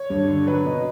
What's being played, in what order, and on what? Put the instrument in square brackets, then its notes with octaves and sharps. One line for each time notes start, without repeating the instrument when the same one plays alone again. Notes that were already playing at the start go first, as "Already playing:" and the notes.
Already playing: [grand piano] C#5
G2
D3
F#3 B4
B2